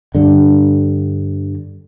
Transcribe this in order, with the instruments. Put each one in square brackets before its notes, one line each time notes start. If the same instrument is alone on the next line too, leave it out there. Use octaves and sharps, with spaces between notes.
[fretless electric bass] G2 D3